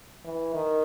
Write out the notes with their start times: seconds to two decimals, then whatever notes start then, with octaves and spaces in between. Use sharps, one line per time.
0.25 E3
0.54 D#3